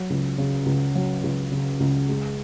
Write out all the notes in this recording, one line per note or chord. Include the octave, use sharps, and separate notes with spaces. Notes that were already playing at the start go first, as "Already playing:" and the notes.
Already playing: F#3
C#2
C#3
C#2
F#3
C#2
C#3
C#2
G#3